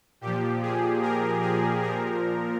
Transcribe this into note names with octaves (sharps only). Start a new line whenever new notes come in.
A#2 F3 G4
G#4
A#4
G#4
A#2 F3 A#4